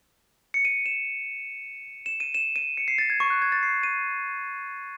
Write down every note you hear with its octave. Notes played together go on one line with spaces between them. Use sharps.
C#7
D#7
E7
E7
D#7
E7
D#7
C#7
C7
A6
G#6
C#6
F#6
G#6
A6
C7
D#7